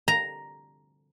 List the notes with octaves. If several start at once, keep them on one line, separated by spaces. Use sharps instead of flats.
A#5